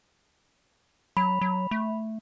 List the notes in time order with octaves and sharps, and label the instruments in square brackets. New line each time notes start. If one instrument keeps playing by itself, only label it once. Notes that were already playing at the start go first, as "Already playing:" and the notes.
[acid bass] F#3 [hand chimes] B5
[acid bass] F#3
A3